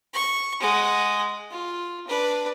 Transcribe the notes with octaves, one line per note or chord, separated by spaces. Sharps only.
C#6
G#3 F#5
F4
D4 B4